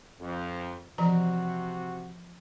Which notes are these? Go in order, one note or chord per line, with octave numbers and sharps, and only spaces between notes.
F2
C3 E3 F3 F#4 A#5